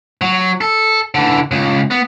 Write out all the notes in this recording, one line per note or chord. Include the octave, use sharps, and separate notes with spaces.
F#3
A4
D3 E3
C#2
B3